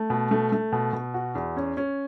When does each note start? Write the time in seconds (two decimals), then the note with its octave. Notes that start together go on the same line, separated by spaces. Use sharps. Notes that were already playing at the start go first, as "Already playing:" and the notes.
Already playing: A3
0.10 B2
0.31 A3
0.52 A3
0.72 B2
0.93 B2
1.14 F#4
1.35 E2
1.57 C#4
1.77 C#4